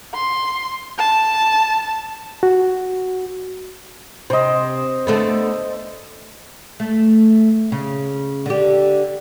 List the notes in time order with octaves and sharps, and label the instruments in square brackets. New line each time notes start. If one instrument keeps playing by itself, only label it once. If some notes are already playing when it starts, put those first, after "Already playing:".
[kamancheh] C6
A5
[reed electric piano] F#4
[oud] C3 [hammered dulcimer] C5 D#5
[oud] D3 A3 B3
A3
C#3
D3 G4